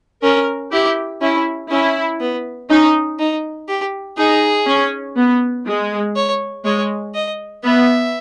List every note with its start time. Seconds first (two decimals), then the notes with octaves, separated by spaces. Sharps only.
0.23 C#4 A#4
0.72 E4 G4
1.21 C#4 E4
1.71 C#4 E4
2.21 B3
2.70 C#4 D#4
3.19 D#4
3.68 G4
4.17 D#4 G#4
4.67 C#4
5.17 B3
5.66 G#3
6.16 C#5
6.65 G#3 C#5
7.14 D#5
7.64 B3 E5